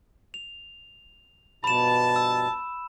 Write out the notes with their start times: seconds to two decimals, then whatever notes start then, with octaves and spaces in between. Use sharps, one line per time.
0.34 F7
1.64 G2 B2 F3 A5 B5 E7
2.16 E6